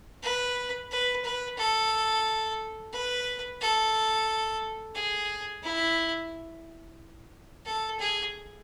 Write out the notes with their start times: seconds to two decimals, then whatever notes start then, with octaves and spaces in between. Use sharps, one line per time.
0.23 B4
0.91 B4
1.24 B4
1.58 A4
2.93 B4
3.61 A4
4.95 G#4
5.63 E4
7.66 A4
8.00 G#4